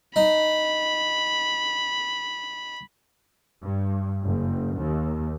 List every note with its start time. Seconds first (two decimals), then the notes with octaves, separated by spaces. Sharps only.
0.16 D#4 B5
3.63 G2
4.23 F#1
4.78 D#2